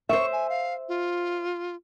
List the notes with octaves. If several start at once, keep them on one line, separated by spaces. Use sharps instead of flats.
C5 E5 C#6
G#5
F5
F4